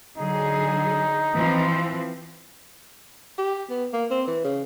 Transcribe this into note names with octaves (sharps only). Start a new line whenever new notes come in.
D3 F#3 D#4 G#4
E3 F3 C4
G4
B3
A#3
C4
E3
C#3